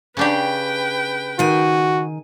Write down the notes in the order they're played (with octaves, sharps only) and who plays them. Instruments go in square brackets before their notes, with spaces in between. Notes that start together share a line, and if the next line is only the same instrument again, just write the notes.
[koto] C#3 D4 G4 [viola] B4 G5
[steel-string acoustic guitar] D#3 G#5 [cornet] F#4